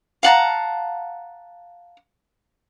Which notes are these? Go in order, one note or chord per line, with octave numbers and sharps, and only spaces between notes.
F5 F#5 A5 A#5